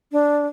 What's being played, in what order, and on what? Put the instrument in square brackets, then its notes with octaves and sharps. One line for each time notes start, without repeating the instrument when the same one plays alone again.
[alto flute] D4